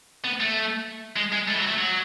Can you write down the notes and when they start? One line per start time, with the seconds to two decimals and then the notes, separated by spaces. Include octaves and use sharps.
0.25 B3
0.40 A3
1.16 G#3
1.32 G#3
1.48 A3
1.53 E3
1.58 F#3
1.68 A3
1.78 F#3